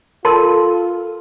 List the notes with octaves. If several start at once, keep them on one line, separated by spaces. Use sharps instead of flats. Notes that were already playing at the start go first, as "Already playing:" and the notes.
F4 A4 A#4 A5 C6